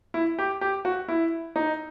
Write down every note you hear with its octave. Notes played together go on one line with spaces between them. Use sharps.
E4
G4
G4
F#4
E4
D#4